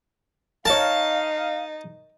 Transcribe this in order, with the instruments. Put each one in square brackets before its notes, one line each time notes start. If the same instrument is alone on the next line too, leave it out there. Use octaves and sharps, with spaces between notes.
[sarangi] D#4 [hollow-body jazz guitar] A#4 C#5 [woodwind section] F5 [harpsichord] A5